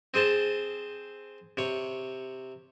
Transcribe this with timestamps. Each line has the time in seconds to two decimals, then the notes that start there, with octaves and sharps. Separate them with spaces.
0.14 C4 G#4 C5 A5
1.57 C3 C#5